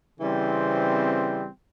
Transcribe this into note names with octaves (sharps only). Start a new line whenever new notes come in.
C#3 E3 G3 C4